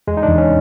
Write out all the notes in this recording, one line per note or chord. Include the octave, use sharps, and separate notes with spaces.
E2 G#3
D#4
D4
E2
C#4